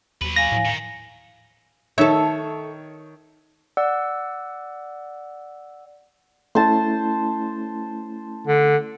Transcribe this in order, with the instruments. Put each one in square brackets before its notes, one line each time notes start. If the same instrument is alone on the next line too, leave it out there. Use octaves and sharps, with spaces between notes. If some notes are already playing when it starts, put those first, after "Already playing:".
[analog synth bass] D#2 [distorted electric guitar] F#3 B4
[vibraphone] F5 G#5 [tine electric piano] A#6
[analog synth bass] A2
[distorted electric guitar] D#3
[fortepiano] D#3 C#5 [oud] A4 E5
[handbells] D5 F#5 E6
[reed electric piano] A3 C#4 E4 [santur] C5 A5
[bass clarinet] D3